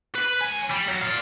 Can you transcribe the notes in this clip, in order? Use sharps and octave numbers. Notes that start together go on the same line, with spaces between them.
B4
C#2 G#5
G3
F#3
D5 F5